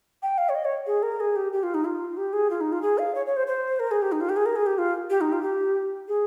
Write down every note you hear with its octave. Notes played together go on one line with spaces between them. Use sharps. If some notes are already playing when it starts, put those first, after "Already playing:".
G5
F5
C#5
D#5
C#5
G#4
A#4
G#4
G4
G4
F4
D#4
F4
G4
G#4
F4
D#4
F4
G#4
F5
C#5
C#5
C5
C5
A#4
G#4
G4
D#4
F4
G4
G#4
A#4
G#4
G4
F4
G4
D#4
F4
G4
G#4